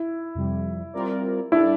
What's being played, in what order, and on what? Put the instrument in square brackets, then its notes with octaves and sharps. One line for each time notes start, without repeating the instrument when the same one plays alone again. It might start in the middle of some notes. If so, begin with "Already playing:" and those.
Already playing: [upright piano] E4
[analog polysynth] F2 C3 G3
G3 C4 F4 A#4 D5
[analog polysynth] G3 D4 A4 D5 [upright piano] E4